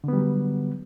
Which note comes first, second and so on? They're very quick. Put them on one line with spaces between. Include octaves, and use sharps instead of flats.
D3 B3 G3 F#3